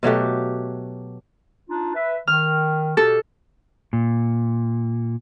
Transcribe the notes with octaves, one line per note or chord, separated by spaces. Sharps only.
B2 F#3 A3 G4
D4 D#4 F4
B4 E5
D#3 F6
B2 F#4 G4 A4
A#2